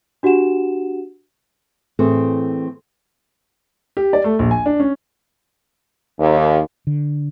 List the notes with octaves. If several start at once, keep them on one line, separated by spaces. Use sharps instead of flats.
D4 F#4 G4 F#5 E7
A2 E3 C4 G#4 A4
G4
D5
A3
A#1
G#5
D4
C#4
D#2
D3